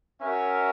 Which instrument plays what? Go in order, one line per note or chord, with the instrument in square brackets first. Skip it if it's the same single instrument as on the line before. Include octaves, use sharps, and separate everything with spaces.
[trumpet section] C#4 F#4 A#4 E5